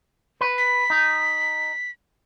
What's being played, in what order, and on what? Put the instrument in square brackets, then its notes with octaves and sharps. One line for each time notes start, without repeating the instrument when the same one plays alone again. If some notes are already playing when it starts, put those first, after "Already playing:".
[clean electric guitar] B4
[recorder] B6
[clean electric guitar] D#4